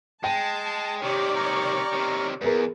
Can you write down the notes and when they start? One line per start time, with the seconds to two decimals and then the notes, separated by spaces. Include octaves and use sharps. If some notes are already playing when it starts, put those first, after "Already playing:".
0.24 G#3 G5 A5
1.02 C3 D#3 G4 C#5 D5
1.36 A#5 C#6 F6
1.93 C3 D#3
2.41 E2 B3 G#4 A#4